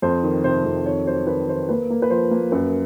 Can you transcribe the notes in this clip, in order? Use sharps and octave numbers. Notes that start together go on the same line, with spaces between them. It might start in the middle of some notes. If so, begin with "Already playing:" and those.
F2 C5
D#3
C3 C5
F2
D#3 C#5
F#3 C5
D#3 B4
D#3 C5
A#3 B4
A#3
B4
F3 C5
A#3
F#2 B4